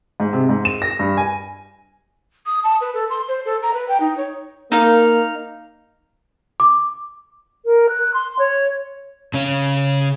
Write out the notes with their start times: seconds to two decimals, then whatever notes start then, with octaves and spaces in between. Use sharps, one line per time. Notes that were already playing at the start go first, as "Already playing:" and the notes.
0.20 G#2
0.33 C3
0.49 G#2
0.65 E7
0.82 A#6
0.99 G2
1.17 G#5
2.46 D#6
2.64 A5
2.81 B4
2.94 A4
3.10 C6
3.28 C5
3.45 A4
3.63 A#5
3.74 B4
3.88 G5
4.00 D#4
4.17 C#5
4.72 A#3 D#4 F5
6.60 D6
7.65 A#4
7.89 F#6
8.14 C6
8.39 C#5
9.34 C#3 C#4